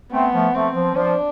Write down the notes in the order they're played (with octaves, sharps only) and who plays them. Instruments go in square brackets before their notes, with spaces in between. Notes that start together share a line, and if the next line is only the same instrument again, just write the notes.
[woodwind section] A3 C4 [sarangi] B3
[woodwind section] F3 A3
[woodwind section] F3 A3 [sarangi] C4
[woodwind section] F3
[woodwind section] F3 [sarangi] D4